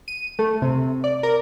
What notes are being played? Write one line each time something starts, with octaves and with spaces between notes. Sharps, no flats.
D#7
A3
C3
D5
A#4